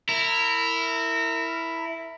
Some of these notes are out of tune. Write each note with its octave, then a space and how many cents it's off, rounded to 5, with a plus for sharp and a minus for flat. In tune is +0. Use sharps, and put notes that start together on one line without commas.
E4 +0 A#4 -25